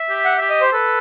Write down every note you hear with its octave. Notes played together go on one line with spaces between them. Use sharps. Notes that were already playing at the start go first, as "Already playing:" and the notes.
Already playing: E5
G4
F#5
G4 E5
D#5
C5
A4 B4